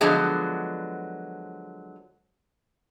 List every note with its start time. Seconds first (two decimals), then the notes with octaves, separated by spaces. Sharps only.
0.01 D3 F3 F#3 G#3 B3